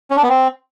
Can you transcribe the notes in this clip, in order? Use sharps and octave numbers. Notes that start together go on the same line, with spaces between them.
C#4
D4
B3
C4